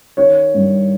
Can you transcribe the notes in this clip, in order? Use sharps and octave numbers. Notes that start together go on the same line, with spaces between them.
D#3 C#5
G2